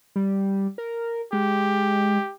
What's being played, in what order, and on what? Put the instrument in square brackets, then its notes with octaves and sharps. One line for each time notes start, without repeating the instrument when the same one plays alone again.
[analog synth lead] G3
A#4
[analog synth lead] G#3 [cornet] G4